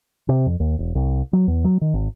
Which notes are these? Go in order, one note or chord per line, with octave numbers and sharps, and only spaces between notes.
C3
F2
D#2
E1
C2
F#3
E2
F#3
D#3
G#1